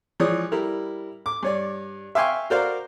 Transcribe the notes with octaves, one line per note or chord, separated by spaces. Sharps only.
E3 F3 G#3 C#5 D5 D#6
G3 E4 A#4
D6
G2 C#5 D5
E5 F5 G5 G#5 C6 C#6
F#4 A#4 C5 D5 F5 A#5